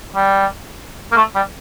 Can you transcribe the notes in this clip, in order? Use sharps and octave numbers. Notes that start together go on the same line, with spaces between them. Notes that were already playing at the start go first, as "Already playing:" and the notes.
G3
A#3
A3
G3